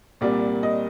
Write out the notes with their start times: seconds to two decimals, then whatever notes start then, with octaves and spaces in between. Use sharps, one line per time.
0.21 C2 A#2 G3 A#3 D5
0.63 D#5